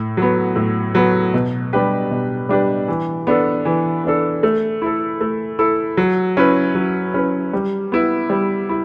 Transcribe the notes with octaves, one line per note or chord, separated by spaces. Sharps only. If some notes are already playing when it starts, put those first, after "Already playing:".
Already playing: A2
F#3 B3
A2
F#3 B3
B2
G3 D4 G4 B4
B2
G3 D4 G4 B4
E3
B3 D4 A4
E3
B3 D4 A4
A3
E4 A4
A3
E4 A4
F#3
C#4 E4 B4
F#3
C#4 E4 B4
G3
B3 E4
G3
E4